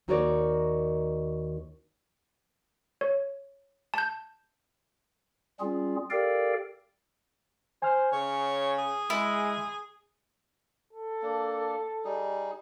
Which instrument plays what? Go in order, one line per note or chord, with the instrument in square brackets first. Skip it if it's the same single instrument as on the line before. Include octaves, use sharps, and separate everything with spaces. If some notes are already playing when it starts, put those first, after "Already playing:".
[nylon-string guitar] D#2 D#4 F#4 A#4 C#5 D5
[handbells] C#5
A5 G6
[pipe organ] G3 C4 C#4 F4 G#4
G4 A4 A#4 D5 F5 G5
[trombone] C5 [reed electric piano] G#5 F6
[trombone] C#3 [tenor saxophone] C#5
[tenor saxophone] G#4
[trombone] G#3 [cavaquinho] E4
[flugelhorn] A4
[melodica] A#3 D4
G3 D#4 G#4